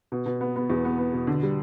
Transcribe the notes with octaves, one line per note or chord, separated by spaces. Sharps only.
B2
B2
B3
B3
E2
B3
B3
B2
D3
G3